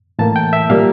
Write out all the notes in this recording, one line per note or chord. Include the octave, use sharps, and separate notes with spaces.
A2 E3 A#3 A5
G5
E5
A#2 G3 A#3 F5